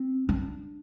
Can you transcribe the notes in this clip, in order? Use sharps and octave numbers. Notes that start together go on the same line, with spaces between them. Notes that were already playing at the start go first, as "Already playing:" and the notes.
Already playing: C4
D4